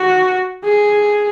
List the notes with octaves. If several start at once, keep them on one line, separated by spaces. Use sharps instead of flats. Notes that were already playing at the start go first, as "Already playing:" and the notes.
Already playing: F#4
G#4